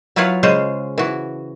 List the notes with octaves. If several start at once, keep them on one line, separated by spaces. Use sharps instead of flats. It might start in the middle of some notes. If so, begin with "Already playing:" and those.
F#3 E4 F4 B4 C#5 F5
C#3 G#3 C#4 C5
E3 F#4